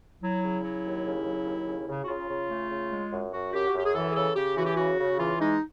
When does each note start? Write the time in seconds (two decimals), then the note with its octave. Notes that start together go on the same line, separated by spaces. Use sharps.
0.21 F#3 E4
0.42 C#3
0.63 F#3
0.84 D#2
1.05 C#3
1.25 F#3
1.46 D#2
1.66 C#3
1.88 C#3
2.03 F#4
2.08 C#3 F4
2.29 C#3
2.49 A3
2.70 C#3
2.91 G#3
3.11 F#2
3.32 F#2 F#4
3.53 F#2 G4
3.67 F#4
3.74 F#2 G4
3.85 G#4
3.94 E3 A4
4.11 G#4
4.15 C#3 A4
4.36 C#3 G4
4.56 E3 F#4
4.65 G4
4.76 C#3 F#4
4.99 C#3
5.19 E3 F4
5.39 G#3 D#4